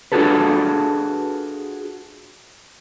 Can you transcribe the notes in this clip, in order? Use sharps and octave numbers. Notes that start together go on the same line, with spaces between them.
D4 F4 F#4 G#4 A4 B4